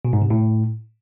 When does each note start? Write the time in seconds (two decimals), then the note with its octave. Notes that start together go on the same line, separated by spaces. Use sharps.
0.05 B2
0.13 G#2
0.22 C3
0.30 A2